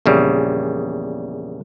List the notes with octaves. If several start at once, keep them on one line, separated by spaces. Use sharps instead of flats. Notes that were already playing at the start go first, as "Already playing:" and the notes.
A#1 E2 C#3 G3